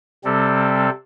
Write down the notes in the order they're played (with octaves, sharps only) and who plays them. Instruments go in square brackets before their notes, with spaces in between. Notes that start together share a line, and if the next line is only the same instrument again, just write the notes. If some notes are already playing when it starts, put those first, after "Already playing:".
[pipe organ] C3 G3 C4 A4